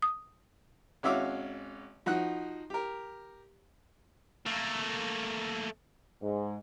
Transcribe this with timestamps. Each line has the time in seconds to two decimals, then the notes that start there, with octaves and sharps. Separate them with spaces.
0.02 D#6
1.03 G#1 C#4 F#4 E5 F5 D6
2.06 F3 D#4 F#4 F#5 F#6
2.70 G4 A#4
4.46 A3 A#3
6.21 G#2